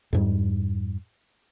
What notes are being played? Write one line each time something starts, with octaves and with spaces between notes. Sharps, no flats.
F2 G#2 G3